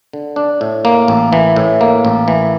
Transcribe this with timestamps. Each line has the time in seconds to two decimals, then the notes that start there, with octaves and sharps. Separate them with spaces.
0.13 D3
0.36 D4
0.61 A2
0.85 A#3
1.08 A1
1.33 E3
1.56 A2
1.81 A#3
2.05 A1
2.28 E3